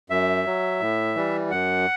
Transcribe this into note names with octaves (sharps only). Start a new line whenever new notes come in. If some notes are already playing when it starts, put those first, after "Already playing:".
F#2 E5
F#3
A2
E3 G3
F#2 F#5